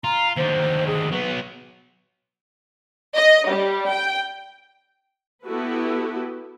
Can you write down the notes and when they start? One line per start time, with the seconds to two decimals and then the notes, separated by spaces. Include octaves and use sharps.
0.04 F4 A#5
0.37 D#2 D3 C5
0.87 G#4
1.13 F#3 B3 B4
3.16 D#5
3.49 G3
3.92 G5
5.45 B3 E4 F#4 G4 A4 B4